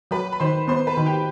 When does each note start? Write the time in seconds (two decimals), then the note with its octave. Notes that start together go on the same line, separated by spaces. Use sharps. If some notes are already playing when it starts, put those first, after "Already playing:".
0.11 F#3 B4 B5
0.32 B5
0.40 D#3 C5 C6
0.68 B3 C5 C6
0.87 B4 B5
0.97 D#3
1.06 G4 G5